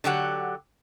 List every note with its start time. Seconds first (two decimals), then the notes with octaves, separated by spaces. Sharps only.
0.04 D3 F#3 G4 F#5